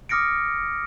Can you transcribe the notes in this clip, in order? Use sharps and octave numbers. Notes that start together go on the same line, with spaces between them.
D6 D#6 F6 A#6 C#7 D7